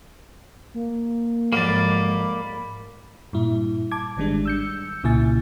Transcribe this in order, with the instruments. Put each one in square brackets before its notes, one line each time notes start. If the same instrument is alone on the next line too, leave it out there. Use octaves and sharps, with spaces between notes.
[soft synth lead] A#3
[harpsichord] F2 F#3 [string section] G#2 [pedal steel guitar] A#3 D5 [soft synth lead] B5
[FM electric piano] G2 A#2 E4
A5 D6 G#6
G#1 D#3 G3 G#3 D4
E6 G6 C#7
C2 A#2 C#3 E4 G#5 A6